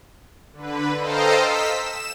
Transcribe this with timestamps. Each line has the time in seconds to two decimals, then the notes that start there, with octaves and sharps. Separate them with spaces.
0.53 D3 B4
0.98 A4 C5 D#5 F5 G5 A#5
1.42 E6 B6
1.77 E7